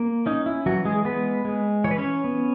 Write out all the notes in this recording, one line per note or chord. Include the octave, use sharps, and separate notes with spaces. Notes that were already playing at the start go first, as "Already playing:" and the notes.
Already playing: A#3
C#4 D#4
E4
E3 F#3 F#4
G#3 G#4
G#3 B3 B4
G#3
E3 C#5
B4
C#4 C#5
B3